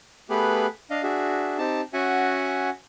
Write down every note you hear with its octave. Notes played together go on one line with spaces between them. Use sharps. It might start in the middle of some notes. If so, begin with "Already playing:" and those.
A3 B3 G4 G#4 B4
D4 D#5 F5
D4 F#4 G#4 E5
C4 D#4 G4 A5
C#4 F#4 E5 F#5 G#5